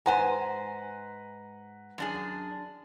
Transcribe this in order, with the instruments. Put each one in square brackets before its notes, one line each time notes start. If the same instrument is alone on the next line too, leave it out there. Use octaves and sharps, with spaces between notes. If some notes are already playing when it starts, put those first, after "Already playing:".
[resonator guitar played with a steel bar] G#2 C5 G#5 [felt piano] B4 F#5 A#5
[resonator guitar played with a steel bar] F#2 D4 G#4